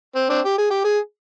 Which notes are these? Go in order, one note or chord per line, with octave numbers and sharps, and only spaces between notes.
C4
C4 D4
G4
G#4
G4
G#4